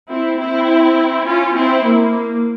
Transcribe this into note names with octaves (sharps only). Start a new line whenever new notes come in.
C4 E4
C4 E4
C#4 F4
C4 E4
A#3